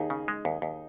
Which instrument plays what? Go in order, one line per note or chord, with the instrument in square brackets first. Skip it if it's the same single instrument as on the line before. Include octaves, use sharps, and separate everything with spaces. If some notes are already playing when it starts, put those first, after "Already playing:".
Already playing: [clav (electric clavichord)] D#2 [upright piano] D#4 G#4
[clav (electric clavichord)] C#3
G#3
D#2
D#2